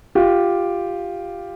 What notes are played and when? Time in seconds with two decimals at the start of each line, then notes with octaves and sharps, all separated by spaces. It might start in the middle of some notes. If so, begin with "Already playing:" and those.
0.15 F4 G4